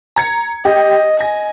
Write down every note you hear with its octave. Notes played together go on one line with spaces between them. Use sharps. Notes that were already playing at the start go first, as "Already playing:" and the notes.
A#5 G#6 C#7
G4 D#5
G#5 A#6